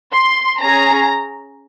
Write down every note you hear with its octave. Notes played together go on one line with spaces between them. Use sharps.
C6
C#4 G#4 A#5